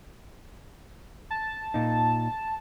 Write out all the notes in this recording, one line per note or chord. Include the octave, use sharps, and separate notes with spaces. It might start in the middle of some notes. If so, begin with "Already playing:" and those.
A5
A#2 D#4